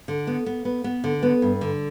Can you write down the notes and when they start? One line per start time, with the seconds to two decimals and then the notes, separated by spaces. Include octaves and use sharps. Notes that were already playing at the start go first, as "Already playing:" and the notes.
0.08 D3
0.27 B3
0.46 B3
0.65 B3
0.84 B3
1.04 D3
1.23 B3
1.42 G2
1.61 D3